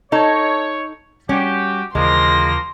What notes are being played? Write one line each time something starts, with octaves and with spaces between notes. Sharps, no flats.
D#4 A4 C#5
G3 C#4 F#4 G4
D#2 C#3 E3 F3 G#3 A#3 C6 A#6